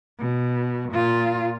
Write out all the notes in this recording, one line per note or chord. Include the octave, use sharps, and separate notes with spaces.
B2
A#2 F4